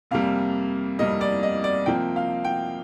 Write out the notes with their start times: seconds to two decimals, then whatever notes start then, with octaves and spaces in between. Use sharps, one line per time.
0.11 F2 C3 G3 A#3 F5
0.99 F2 C3 G3 A#3 D#5
1.21 D5
1.43 D#5
1.64 D5
1.86 C3 F3 A#3 G5
2.16 F5
2.45 G5